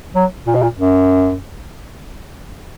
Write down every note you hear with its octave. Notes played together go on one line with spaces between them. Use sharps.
F#3
A#2
B2
A#2
F#2